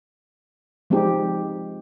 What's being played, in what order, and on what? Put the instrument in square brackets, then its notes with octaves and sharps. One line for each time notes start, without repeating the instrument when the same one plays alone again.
[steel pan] F3 G#3 C4 D#4 G4